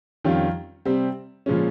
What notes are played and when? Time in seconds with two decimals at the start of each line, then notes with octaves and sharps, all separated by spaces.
0.25 F2 D#3 G3 C#4 F4
0.85 C3 G3 C4
1.46 A#2 F3 G#3 C#4